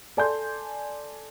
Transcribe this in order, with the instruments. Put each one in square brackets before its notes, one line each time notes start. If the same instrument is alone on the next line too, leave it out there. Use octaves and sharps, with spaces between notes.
[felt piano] A4 D5 G#5 A5 C6 G6